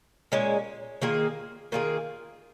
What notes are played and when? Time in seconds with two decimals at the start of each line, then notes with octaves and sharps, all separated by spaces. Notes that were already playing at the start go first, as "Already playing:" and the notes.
0.32 A#2 G#3 C#4
1.02 D#3 A#3 F4 G#4
1.72 D#3 A#3 F4 G#4